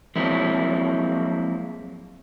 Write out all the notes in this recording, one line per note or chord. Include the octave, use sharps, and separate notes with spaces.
F3 F#3 G#3 A#3 C4 E4